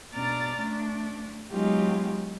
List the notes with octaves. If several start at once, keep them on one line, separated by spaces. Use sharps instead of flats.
B2 D4 D5 A#5 F6 A6
A3 D4
F#3 G#3 B3 D#4 F4 G4